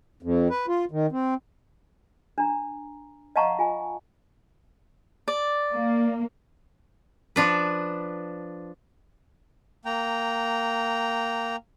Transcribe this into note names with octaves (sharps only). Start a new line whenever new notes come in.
F2
B4
F4
D#3
C4
D4 A#5
D#5 F5 F#5 A5 A#5 C#6
F4 G#5
D5
A#3
F3 D4 B4
A#3 G5 A#5